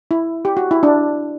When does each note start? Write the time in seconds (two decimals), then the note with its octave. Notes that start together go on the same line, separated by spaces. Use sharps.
0.11 E4
0.45 G4
0.57 F#4
0.71 E4
0.83 D4